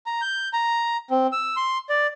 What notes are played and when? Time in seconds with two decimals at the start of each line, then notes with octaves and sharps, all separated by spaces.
0.06 A#5
0.21 G6
0.53 A#5
1.10 C4
1.32 E6
1.57 C6
1.89 D5